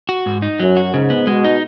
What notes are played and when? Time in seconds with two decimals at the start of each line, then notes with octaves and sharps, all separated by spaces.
0.09 F#4
0.26 G#2
0.42 D#4
0.60 F#2 F#3
0.77 F#4
0.93 G#2 C#3
1.10 B3
1.27 B2 G#3
1.45 D#4